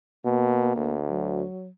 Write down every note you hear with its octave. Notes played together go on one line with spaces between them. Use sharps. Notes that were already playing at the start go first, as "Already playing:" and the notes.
B2 A#3
D2
F#3